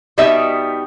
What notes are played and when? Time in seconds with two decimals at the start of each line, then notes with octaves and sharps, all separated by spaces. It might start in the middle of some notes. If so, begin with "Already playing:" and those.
0.18 B2 G3 B3 D#4 E5